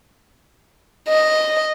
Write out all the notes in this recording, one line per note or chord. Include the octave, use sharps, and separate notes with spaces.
D#5